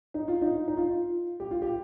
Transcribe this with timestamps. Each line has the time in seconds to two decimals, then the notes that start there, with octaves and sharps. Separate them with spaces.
0.14 D#4
0.28 F4
0.42 D#4
0.68 D#4
0.77 F4
1.40 G4
1.51 F4
1.62 G4